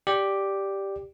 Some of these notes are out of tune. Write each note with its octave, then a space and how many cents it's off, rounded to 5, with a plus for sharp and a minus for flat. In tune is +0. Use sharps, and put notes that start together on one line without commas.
G4 +0 D5 +0